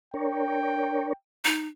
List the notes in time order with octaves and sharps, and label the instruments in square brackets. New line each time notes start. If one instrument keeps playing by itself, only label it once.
[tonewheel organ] D4 A#4 C#5 [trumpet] G5
[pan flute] D#4